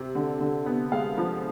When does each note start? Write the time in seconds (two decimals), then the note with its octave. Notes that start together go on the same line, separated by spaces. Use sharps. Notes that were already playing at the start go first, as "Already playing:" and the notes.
Already playing: C3
0.15 D3
0.41 D3
0.66 B3
0.92 G#3 F5
1.18 F3